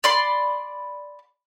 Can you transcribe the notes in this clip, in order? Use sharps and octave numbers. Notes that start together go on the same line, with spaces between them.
D5 B5 C6